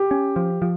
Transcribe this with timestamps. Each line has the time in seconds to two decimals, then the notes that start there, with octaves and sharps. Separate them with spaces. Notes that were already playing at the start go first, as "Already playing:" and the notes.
Already playing: G4
0.11 C#4
0.36 F3
0.62 F3